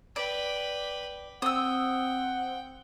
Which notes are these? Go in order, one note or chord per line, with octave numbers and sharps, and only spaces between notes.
B4 D5 G5
C4 F#5 G5 D#6 E6